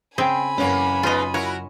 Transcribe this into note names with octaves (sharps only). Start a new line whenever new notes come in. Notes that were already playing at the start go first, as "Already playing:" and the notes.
C#3 C4 G#4 F5 G5 G#5 B5
F#2 E3 A#3 C#4 C#5
G#3 B3 D#4 F4 D#5
E4 F#4 A#4 C#5